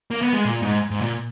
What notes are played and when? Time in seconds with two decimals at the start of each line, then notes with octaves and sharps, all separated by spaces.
0.11 A#3
0.22 B3
0.33 G#3
0.45 A#2
0.62 G#2
0.90 G#2
1.01 A#2